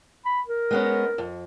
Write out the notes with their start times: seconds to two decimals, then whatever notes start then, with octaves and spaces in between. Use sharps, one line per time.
0.25 B5
0.47 A#4
0.71 G#3 B3 C#4
1.18 F2